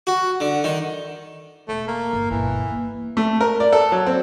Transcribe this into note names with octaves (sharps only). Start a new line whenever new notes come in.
F#4
D3
D#3
E1 A3
A#3
G1
G1 B2 E3
A#3
A3
A#4
D5
A4
F#3
C4